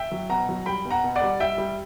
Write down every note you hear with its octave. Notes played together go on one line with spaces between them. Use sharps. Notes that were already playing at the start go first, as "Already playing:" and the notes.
Already playing: E5 G5
F#3
B2 F#5 A#5
F#3
G3 G5 B5
B2
F#5 A#5
B2
D5 F#5
G3
G3 E5 G5
G3